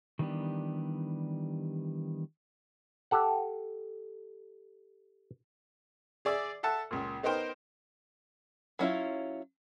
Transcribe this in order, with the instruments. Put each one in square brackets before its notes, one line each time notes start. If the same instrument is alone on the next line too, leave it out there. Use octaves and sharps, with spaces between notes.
[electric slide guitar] D#3 E3 G3 B3 D4 G4
[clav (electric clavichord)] G4 A4 F#5
[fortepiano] G#4 D5 E5
A4 E5 F#5 A5
C#2 A#2
B3 D#4 A#4 C5 G5
[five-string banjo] F#3 C#4 E4 F4